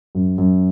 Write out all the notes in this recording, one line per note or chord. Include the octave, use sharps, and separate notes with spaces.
F#2
F#2